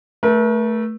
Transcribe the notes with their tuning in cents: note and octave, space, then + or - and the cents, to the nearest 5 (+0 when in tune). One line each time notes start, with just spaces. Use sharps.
A3 +0 A#4 +45